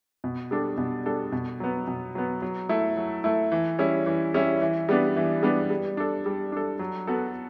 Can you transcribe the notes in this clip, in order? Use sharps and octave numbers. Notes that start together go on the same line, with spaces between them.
B2
G3 D4 A4
B2
G3 D4 A4
B2
F#3 B3
B2
F#3 B3
F#3
A3 E4 A4
F#3
A3 E4 A4
E3
G3 C#4 E4
E3
G3 C#4 E4
E3
G3 B3 D4
E3
G3 B3 D4
G3
D4 A4
G3
D4 A4
F#3
B3 F#4 A4